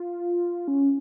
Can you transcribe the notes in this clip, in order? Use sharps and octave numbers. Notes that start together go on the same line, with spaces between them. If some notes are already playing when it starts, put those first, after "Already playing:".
Already playing: F4
C#4